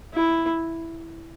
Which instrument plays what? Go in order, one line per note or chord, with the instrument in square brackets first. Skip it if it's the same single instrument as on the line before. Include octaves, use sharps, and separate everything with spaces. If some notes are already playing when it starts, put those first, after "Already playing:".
[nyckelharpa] E4